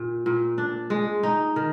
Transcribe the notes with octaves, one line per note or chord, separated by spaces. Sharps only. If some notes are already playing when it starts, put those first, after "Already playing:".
Already playing: A#2
A#2
D4
G#3
D#4
D#3